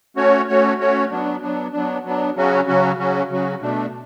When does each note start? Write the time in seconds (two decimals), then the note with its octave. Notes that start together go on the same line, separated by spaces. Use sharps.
0.16 A3 C#4 F#4 C#5
0.48 A3 C#4 F#4 C#5
0.80 A3 C#4 F#4 C#5
1.11 F#3 B3 D4
1.42 F#3 B3 D4
1.73 F#3 B3 D4
2.05 F#3 B3 D4
2.36 C#3 F#3 C#4 F#4
2.67 C#3 F#3 C#4 F#4
2.98 C#3 F#3 C#4 F#4
3.29 C#3 F#3 C#4 F#4
3.62 B2 A3 D4